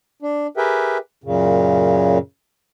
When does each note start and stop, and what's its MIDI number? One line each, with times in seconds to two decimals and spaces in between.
0.22 0.47 62
0.57 0.98 67
0.57 0.98 68
0.57 0.98 70
0.57 0.98 71
0.57 0.98 76
0.57 0.98 79
1.24 2.18 42
1.24 2.18 46
1.24 2.18 49